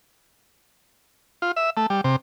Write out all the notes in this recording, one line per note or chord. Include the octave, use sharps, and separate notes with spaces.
F4
E5
A3
G3
C3